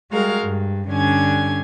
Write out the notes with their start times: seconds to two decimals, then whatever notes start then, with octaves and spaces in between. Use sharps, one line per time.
0.11 G3 G#3 F#4 G#4 A#4 F5
0.41 G2
0.88 G2 D3 C#4 D4 G#5 G#6